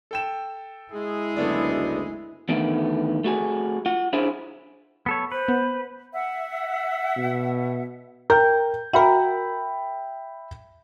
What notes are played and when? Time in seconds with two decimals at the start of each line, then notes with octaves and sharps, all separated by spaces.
0.11 A4 G5 E7
0.92 G#3 E4 G#4
1.36 F#1 D2 A3 B3 D4
2.49 E2 D3 D#3 A3 B3
3.24 A3 F#4 G#4
3.86 F4 F#5
4.13 C#4 D4 E4 F4 G#4 C5
5.06 B3 A4 C#5
5.32 B4 C5
5.48 B3
6.13 E5 F#5
7.17 B2
8.30 A#4 G5 G6
8.93 F#4 A#4 E5 G5 B5